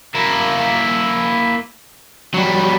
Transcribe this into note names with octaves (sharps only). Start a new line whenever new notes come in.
A#3 E4
F#3 G3